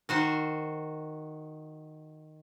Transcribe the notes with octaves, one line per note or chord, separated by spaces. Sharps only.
D#3 F#4 C5